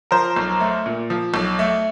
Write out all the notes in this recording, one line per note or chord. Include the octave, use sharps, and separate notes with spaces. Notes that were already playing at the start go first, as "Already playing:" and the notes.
F3 A#4 C5
B1
A3
A#2
F3
B1
A3